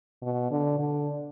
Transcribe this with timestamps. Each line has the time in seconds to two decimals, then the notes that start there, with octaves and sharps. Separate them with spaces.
0.23 B2
0.51 D3
0.79 D3